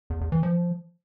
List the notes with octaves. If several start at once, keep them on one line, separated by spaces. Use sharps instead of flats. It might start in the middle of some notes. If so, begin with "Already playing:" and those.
E2
E2
E3
F3